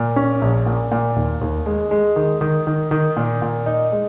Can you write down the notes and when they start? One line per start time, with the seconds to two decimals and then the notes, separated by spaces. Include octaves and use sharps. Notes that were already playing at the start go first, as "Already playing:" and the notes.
Already playing: A#2
0.16 C#4
0.42 A#1
0.66 A#2
0.92 A#2
1.16 D#2
1.41 D#2
1.66 G#3
1.91 G#3
2.16 D#3
2.41 D#3
2.67 D#3
2.91 D#3
3.17 A#2
3.42 A#2
3.66 D#4
3.92 G#3